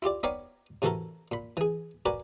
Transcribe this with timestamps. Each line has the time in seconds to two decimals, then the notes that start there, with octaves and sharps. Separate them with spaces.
0.02 E4 F4 G4 D5
0.23 B3 D#4 C#5 D5 F5 G5
0.82 C3 E3 A3 F#4 A4 A#4
1.32 A#2 B5
1.57 E3 G#4
2.06 F#4 A#4 B4 D5 G#5